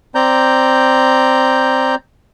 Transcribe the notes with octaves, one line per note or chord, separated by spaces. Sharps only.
C4 D5 A#5 G6